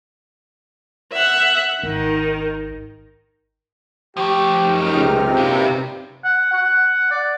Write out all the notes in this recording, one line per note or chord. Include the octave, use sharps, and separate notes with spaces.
E5 F#5
G#1 D#3 D#4
F3 A3 G4
F#2 D#4 F6
C#2 C3 G4
F#2 A#2 B4 F5
F#5
F#5
D5